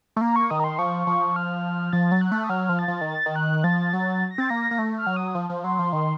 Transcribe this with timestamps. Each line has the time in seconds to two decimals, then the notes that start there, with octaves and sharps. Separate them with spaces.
0.16 A3
0.21 A#3 A#5
0.36 C#6
0.50 D#3 D#6
0.60 A#5
0.64 C6
0.79 F3 C#6
1.07 F3
1.36 F6
1.93 F3 A6
2.12 F#3
2.21 F#6
2.32 A3
2.44 D#6
2.49 F#3 F6
2.69 F3
2.79 A6
2.88 F3
3.01 D#3
3.07 A6
3.26 D#3 A6
3.36 F#6
3.64 F3 A6
3.93 F#3
4.31 A#6
4.38 C4 A6
4.49 A#3 A#6
4.71 A#3
4.79 A3
4.98 F6
5.07 F#3
5.16 D#6
5.35 F3
5.50 F3
5.64 F#3 C6
5.79 F3
5.92 D#3 C6